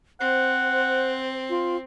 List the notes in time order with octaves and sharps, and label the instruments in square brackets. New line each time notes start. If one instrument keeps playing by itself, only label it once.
[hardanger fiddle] C4 [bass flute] C5 [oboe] F#5
[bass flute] F4